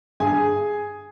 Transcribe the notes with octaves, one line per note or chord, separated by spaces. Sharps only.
G2 G#4 G#5